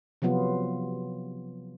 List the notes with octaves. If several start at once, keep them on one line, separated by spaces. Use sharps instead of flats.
C3 F3 F#3 B3 F4